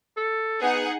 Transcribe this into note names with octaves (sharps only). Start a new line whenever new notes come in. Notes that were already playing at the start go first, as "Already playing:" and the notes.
A4
B3 D#4 G#4 F#5